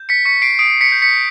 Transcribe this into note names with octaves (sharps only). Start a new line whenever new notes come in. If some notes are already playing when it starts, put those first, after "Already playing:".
Already playing: G6
B6 C#7
C#6 B6 C#7
C7 D7
D#6 C7 D7
B6 C#7
G6
B6 C#7